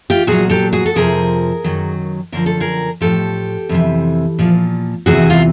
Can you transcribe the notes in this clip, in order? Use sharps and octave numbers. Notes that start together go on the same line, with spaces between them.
F4 G4
A#2 F#3 F#4 G#4
G4 A4
F#4 G#4
A4
F2 C3 F3 G#4 A#4
F#2 D#3 F#3
F#2 D3 F3 A#4
A4
G#4 A#4
A2 F3 G4 A4
F2 C3 E3
A#2 F3
E2 C3 E3 F#4 G#4
F4